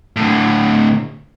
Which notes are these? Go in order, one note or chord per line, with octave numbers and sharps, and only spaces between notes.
A2 D3